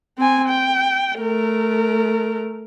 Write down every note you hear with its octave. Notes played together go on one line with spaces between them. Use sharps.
C4 G#5
G5
A3 A#4